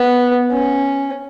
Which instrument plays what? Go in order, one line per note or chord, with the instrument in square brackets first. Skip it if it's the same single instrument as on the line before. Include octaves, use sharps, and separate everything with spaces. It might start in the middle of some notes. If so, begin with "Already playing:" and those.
Already playing: [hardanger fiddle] B3
C#4